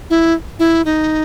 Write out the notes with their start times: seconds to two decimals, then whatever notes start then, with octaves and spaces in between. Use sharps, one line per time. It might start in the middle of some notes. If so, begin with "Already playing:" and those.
0.10 E4
0.59 E4
0.85 D#4